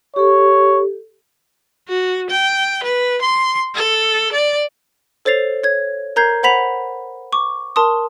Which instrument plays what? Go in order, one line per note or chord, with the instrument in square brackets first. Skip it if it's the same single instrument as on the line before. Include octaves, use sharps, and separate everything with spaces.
[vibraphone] G4 A4 [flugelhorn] C#5
[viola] F#4
G5
B4
C6
A4
D5
[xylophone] A4 C5 C#5 A6 C7 F7
C#5 G#6
A#4 A#5 G6 G#6 C7
C5 F#5 B5 B6 F7
C#6 D6
A#4 A5 C6 D#6